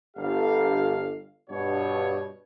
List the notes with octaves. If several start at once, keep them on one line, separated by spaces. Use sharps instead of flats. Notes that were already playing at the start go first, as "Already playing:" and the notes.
G1 G4 F5
G2 B2 C#5